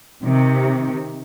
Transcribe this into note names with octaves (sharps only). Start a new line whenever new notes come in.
C3 D#3